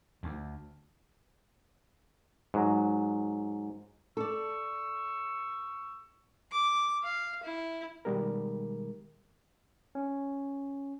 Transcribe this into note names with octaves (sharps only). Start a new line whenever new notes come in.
D2
G#2 F#3
A4 D5 C#6 E6
D6
F5
E4
B2 D#3 G3 G#3 A#4
C#4